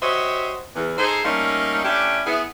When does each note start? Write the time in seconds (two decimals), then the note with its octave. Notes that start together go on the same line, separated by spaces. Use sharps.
0.02 F#4 G4 C5 C#5 D#5 E5
0.75 E2
0.98 D#4 G#4 A4 C5
1.25 G3 A3 A#3 C#4 D#4
1.85 A3 C#4 D4 E4 G4
2.26 B3 E4 G#4